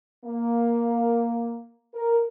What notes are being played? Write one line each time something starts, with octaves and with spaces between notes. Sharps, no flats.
A#3
A#4